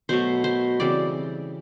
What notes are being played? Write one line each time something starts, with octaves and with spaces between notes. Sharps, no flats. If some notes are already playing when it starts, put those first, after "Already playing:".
B2 F#3 A3 C5
C5
C#3 E3 G3 C4 D5